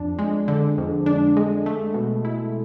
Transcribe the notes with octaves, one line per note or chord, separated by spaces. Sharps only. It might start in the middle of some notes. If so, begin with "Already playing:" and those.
Already playing: F2 D4
G#3
D3
F2
D4
G#3
A3
B2
E4